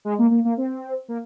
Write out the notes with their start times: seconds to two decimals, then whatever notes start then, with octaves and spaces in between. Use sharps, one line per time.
0.05 G#3
0.19 A#3
0.31 A#3
0.45 A#3
0.57 C4
1.08 A#3